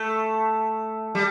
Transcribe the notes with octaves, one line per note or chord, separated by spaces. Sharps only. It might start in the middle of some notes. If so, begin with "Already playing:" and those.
Already playing: A3
G3